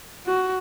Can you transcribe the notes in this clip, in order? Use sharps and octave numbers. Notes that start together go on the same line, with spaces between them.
F#4